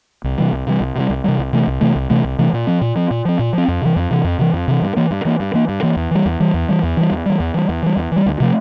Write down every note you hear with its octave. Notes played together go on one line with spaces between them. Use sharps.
C2
C3 E3 G3
C2
C3 E3 G3
C2
C3 E3 G3
C2
C3 E3 G3
C2
C3 E3 A3
C2
C3 E3 A3
C2
C3 E3 A3
C2
C3 E3 A3
A#2
F3 C4
A#2
F3 C4
A#2
F3 C4
A#2
F3 C4
F2
C3 E3
F2
C3 E3
F2
C3 E3
F2
C3 E3
G2
E3 A#3
G2
E3 A#3
G2
E3 A#3
G2
E3 A#3
E2
E3 G3
E2
E3 G3
E2
E3 G3
E2
E3 G3
E2
E3 G3
E2
E3 G3
E2
E3 G3
E2
E3 G3
D2
C3 F3 A3